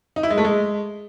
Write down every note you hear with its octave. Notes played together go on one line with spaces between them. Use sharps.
D#4
E4
G#3
A3
G#3